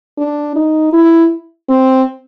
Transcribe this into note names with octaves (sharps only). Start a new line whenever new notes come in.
D4
D#4
E4
C4